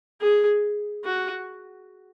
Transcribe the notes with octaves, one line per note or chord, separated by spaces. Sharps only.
G#4
F#4